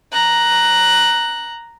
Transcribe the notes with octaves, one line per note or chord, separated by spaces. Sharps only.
A#5 F#6